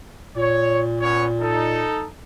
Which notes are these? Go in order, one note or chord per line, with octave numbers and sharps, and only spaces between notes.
A#2 C#5
B3 C#4 C#5
D#4 A4